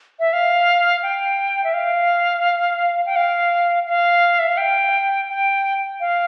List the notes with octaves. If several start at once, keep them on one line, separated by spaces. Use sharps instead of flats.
E5
F5
G5
E5
F5
G5
F5
F5
E5
F5
G5
G5
F5